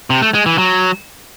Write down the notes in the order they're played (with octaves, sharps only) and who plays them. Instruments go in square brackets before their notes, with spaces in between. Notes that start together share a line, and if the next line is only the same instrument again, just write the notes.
[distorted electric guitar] C3
A3
G#3
E3
F#3